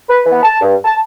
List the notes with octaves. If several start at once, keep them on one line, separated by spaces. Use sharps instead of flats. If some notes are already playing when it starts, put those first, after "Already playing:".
B4
E3 B3 B4
A5
G2
A5